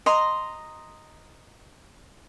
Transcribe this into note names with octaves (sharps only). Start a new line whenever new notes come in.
D#5 A#5 C6